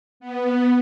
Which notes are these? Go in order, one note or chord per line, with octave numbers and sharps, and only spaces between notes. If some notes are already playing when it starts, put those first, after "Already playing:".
B3